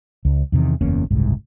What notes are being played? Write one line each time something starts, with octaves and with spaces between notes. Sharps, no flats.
C#2
E2 C3 D#3
F#1 E2 A#3 C#4
F#1 C2 G#2